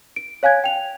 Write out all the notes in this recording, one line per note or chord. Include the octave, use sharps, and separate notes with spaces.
D7
C#5 F5 G#5 F#6 G#6
G5 F7